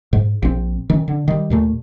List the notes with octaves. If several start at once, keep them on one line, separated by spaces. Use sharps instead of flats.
G#2
A#1 C4
D#3 C#4
D3
D#3 G3
D#2 A#2 A3